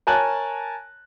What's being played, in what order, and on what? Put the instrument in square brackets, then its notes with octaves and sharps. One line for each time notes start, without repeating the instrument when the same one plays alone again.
[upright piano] A#4 C#5 G#5 A5 F#6